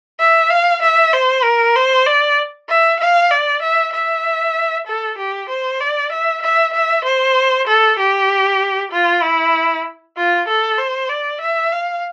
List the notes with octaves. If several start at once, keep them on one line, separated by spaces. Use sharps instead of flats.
E5
F5
E5
C5
A#4
C5
D5
E5
F5
D5
E5
E5
A4
G4
C5
D5
E5
E5
E5
C5
A4
G4
F4
E4
F4
A4
C5
D5
E5
F5